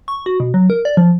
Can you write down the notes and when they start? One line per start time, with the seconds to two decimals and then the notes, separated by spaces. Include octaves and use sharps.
0.08 C#6
0.26 F#4
0.40 B2
0.54 F#3
0.70 A#4
0.85 D5
0.97 F3